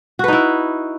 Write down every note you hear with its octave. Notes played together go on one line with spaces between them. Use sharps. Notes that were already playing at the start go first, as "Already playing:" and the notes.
D#4 E4 F#4 B4